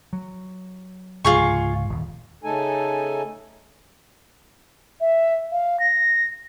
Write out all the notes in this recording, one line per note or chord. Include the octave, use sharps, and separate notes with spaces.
F#3
C#2 G#2 C3 F4 G#4 C#6
D#1
C#3 A3 D#4 A4 G#5
E5
F5
A#6